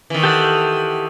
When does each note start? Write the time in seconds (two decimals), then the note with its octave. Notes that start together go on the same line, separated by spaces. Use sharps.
0.10 D#3 E3
0.24 G4 A4 F#5